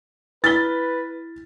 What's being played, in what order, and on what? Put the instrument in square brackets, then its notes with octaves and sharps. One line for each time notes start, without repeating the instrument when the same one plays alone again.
[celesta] E4 F6 G7 [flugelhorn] B4 [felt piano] A6 B6